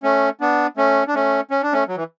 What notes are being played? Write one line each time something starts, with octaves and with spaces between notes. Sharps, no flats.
A3 C#4
B3 D4
A3 C#4
D4
A3 C#4
C#4
D4
A3 C#4
F#3
E3